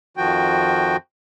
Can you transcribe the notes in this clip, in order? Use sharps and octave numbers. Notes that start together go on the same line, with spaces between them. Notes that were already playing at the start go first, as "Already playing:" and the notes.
F2 D#3 F3 F#4 G5